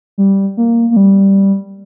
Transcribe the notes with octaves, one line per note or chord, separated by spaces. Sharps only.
G3
A#3
A#3
G3